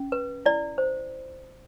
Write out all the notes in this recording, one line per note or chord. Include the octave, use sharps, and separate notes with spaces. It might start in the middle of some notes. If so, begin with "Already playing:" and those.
Already playing: C#4
B4
E4 D5
C5